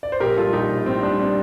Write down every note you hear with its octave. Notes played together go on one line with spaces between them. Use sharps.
D5
C5
A#1 G4 A#4
G3 F4 A4
A#1 D#4 G4
A#1
A2 C4
G3 D4
D4
G3 C4